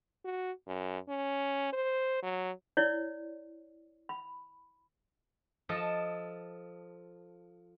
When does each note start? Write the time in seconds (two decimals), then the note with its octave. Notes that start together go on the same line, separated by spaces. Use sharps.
0.25 F#4
0.67 F#2
1.09 C#4
1.73 C5
2.23 F#3
2.77 E4 C#5 D5
4.09 B5
5.69 F3 A4 D#5 A5